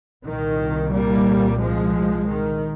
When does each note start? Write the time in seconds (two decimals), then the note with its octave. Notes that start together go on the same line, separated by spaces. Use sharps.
0.25 C2 A#2 D#3
0.92 G3 A#3
1.60 F3 G#3
2.27 D#3